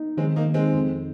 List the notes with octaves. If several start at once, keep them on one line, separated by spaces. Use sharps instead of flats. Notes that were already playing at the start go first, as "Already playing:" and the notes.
Already playing: D#4
D#3 G#3 C4
A#3 D#4
D#3
G#3 C4
F2